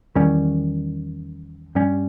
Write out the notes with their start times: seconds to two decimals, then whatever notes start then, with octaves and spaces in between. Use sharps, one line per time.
0.15 E2 D#3 G3 C#4
1.75 G2 G3 C#4